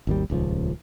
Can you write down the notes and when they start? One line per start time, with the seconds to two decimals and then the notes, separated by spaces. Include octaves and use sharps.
0.07 G#1 D#2 G3
0.30 D#1 C#2 B2 F3